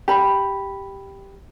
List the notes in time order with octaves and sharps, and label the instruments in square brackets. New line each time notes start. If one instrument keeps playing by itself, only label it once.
[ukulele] G4 B5